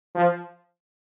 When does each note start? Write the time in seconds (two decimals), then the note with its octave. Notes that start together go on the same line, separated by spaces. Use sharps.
0.15 F3